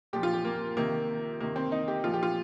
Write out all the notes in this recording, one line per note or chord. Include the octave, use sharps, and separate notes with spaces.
A#2 F3 G4
F4
G4
A#3
C3 D#3 A#3
C3 D#3 A#3
C4
D#4
G4
A#2 F3 F4
G4
F4